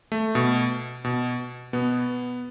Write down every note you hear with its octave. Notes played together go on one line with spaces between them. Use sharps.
A3
B2
B2
B2 B3